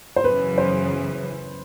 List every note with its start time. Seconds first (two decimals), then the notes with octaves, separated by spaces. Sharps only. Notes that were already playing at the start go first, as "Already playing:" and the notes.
0.16 C5
0.24 F#2 C#3 E3 B4
0.58 C5